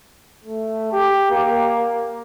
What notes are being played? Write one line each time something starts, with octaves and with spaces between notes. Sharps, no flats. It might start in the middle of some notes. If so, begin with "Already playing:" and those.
A3
G4
A#3